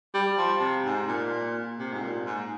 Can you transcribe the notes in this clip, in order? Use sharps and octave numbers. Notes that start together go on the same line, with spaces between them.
G3
F3
C3
G#2
A#2
C3
G#2
A#2
G#2